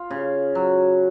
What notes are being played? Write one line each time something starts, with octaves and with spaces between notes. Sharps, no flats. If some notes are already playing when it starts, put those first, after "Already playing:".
Already playing: F4
C#3
F#3